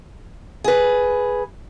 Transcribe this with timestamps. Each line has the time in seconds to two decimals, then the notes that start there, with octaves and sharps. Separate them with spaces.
0.64 G#4 B4